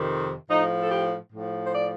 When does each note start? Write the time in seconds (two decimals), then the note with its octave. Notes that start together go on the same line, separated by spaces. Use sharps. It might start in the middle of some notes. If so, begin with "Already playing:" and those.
Already playing: F2 C3 D#3
0.48 A2 F3 D#4
0.81 A4
0.90 G4
1.31 A2 F3
1.65 C5
1.73 D5